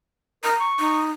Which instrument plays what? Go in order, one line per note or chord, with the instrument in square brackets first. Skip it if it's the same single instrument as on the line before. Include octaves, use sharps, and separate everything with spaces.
[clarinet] A#4 [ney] A#5
[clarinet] C#6
[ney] D#4